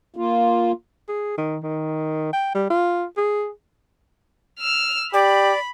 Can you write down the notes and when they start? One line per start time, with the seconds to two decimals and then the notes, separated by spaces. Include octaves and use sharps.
0.16 A#3 F4
1.09 G#4
1.38 D#3
1.63 D#3
2.33 G5
2.55 G3
2.70 F4
3.18 G#4
4.60 E6 F6
5.14 G4 D5 B5